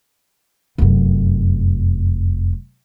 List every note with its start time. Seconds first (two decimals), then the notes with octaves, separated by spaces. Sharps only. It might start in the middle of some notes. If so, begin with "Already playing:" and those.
0.78 F1 F#2